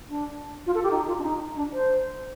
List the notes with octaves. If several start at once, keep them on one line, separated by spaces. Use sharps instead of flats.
D4
F4
A4
G4
D#4
F4
D4
D#4
D4
C5